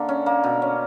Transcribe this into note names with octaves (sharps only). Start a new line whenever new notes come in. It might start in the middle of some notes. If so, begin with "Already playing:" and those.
Already playing: D3 A#3 E5
C#4
A#3
B2
C#4